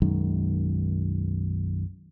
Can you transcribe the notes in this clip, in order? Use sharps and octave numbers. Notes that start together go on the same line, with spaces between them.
B1 F#2 D#3 G#3